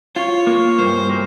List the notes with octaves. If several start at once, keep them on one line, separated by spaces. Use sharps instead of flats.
F4 C#5
A#3
G2 C5
A#3